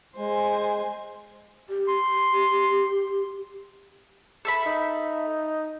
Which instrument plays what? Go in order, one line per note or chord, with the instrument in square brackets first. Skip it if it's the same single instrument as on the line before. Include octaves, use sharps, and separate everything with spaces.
[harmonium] G#3 [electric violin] C5 G#5
[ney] G4
[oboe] C6
[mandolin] A4 E5 B5
[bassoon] D#4